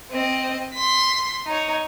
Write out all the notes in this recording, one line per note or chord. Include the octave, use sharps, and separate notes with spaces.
C4 D#5
C6 B6
D#4 C#5